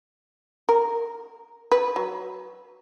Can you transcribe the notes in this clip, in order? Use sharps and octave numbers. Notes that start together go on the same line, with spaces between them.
A#4
B4
F#3